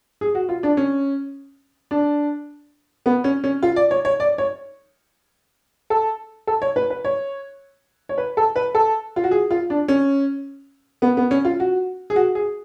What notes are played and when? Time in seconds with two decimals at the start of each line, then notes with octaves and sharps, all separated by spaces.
0.21 G#4
0.35 F#4
0.49 F4
0.63 D4
0.77 C#4
1.91 D4
3.06 B3
3.24 C#4
3.44 C#4
3.63 F4
3.76 D5
3.91 C#5
4.05 C#5
4.20 D5
4.38 C#5
5.90 A4
6.47 A4
6.62 C#5
6.76 B4
6.90 B4
7.05 C#5
8.09 C#5
8.18 B4
8.37 A4
8.56 B4
8.75 A4
9.16 F4
9.24 F#4
9.31 G#4
9.51 F4
9.70 D4
9.88 C#4
11.02 B3
11.17 B3
11.31 C#4
11.45 F4
11.60 F#4
12.10 G#4
12.16 F#4
12.35 G#4